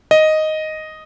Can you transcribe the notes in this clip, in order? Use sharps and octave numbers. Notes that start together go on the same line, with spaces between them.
D#5